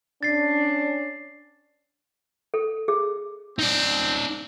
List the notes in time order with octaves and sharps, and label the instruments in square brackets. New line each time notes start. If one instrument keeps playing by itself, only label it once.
[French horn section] C#4 D4 [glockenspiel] A6 C7
[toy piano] A4
G#4
[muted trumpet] C4 [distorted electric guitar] D#4 D5